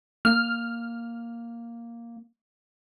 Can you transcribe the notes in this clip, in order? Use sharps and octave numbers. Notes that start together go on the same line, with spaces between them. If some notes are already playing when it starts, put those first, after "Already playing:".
A#3 F6